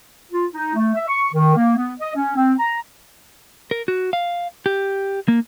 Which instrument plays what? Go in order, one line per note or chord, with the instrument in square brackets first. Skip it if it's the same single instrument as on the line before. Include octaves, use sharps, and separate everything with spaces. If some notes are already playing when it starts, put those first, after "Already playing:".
[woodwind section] F4
D#4
A3
E5
C#6
D#3
A#3
B3
D#5
C#4
C4
A#5
[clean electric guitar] A#4
F#4
F5
G4
A#3